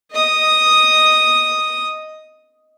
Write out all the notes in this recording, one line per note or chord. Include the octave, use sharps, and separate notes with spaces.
D#5 D#6